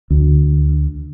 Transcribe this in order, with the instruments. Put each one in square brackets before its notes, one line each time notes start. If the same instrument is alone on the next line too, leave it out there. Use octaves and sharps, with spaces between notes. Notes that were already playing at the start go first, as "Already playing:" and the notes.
[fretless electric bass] D2